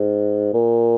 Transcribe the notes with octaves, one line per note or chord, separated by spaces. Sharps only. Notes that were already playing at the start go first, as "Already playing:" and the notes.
Already playing: G#2
A#2